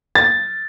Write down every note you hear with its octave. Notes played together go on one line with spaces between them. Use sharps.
A6